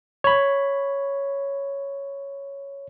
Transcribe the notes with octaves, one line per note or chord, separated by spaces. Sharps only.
C#5 B5